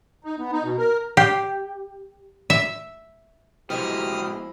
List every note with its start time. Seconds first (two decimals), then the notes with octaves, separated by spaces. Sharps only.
0.24 D#4
0.39 B3
0.53 D#4
0.64 B2
0.78 A#4
1.17 G4
2.50 E5
3.70 G#2 B2 F3 G#3 E4 G4 D#6 F6